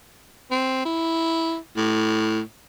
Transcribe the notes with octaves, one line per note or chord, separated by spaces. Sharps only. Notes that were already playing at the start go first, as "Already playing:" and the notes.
C4
E4
A2